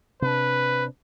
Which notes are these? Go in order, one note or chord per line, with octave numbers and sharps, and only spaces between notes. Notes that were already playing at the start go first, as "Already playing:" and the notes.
C3 C#4 D4 B4